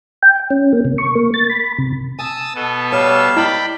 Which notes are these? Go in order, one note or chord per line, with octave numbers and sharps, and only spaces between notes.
G5
C#4
A#3
C3
C#6
A#3
A6
B5
C3
G#5 A5 D#6 E6
B2 B3 A4
G3 C#5 F5 E6
E4 D5 D#5 G5 B5